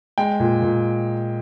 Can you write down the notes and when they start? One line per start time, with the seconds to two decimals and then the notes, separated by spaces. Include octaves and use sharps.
0.18 G#3 G5
0.40 A#2
0.62 A#2